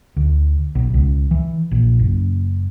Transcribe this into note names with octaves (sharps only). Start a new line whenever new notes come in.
D2
B1
C#2
E3
A#1
F#1